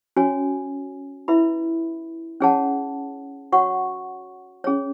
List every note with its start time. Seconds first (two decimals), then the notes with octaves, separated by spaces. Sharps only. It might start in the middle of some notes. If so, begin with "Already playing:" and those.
0.16 C#4 F#4 C#5 G#5
1.28 E4 B4 E5 B5
2.40 C#4 G#4 C#5 F#5 A5
3.52 F#4 C#5 F#5 C#6
4.64 C#4 G#4 C#5